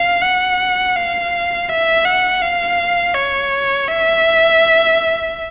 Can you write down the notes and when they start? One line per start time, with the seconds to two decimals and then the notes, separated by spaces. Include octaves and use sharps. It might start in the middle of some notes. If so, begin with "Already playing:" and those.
Already playing: F5
0.22 F#5
0.96 F5
1.69 E5
2.05 F#5
2.41 F5
3.15 C#5
3.88 E5